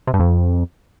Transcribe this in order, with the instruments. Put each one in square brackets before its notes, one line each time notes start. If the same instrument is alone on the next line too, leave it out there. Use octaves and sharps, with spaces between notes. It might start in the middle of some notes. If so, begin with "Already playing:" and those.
[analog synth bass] C3
G2
F2